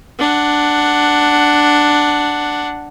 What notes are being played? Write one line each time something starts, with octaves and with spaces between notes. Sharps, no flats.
D4 F#5